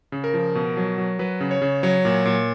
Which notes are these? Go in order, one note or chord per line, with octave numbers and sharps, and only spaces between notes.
C#3
A#4
F3
B2
F#3
F#3
F#3 B4
C#3
C#5
C#3
F#3 C#5
A#2
A#2